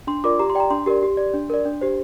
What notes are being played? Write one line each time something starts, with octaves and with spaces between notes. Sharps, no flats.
D4 C6
F4 A#4 D5 D6
G4 A#5
C6
D5 G5
A#5
D4 C6
G4 A#4 D5
G4
D5
D4
A#4 D5
D4
G4 C5